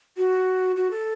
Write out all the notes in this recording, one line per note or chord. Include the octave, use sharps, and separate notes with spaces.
F#4
F#4
A4